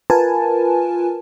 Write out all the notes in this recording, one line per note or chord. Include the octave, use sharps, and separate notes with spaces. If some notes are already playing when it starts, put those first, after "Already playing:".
F4 A#4 B4 G#5 A5